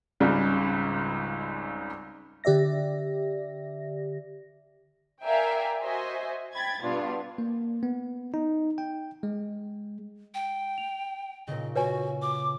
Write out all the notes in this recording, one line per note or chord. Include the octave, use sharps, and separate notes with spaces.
G#1 C#2 G#2 C#3 G3
D3 G4 D5 E5 A#6
A#4 D5 E5 F5 G5 G#5
F#4 C5 D#5 E5 G#5
G5 B5 G#6 A6
G2 B2 B3 D4 F4
A#3
B3
D#4
G5
G#3
G5
F7
A#2 C#3 D#5
F#4 B4 C#5 G#5
D6